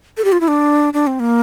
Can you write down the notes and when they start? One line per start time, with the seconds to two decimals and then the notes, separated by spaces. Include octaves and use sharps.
0.17 A4
0.24 G4
0.32 F4
0.40 E4
0.48 D4
0.93 D4
1.07 C4
1.20 A#3